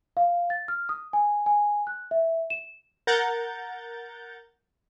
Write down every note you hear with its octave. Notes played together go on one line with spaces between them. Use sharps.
F5
A6
F6
D#6
G#5
G#5
F#6
E5
E7
A#4 F#5 A#5 G6 A6